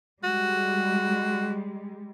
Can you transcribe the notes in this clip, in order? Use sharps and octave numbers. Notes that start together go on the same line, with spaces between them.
G3 G#3 F#4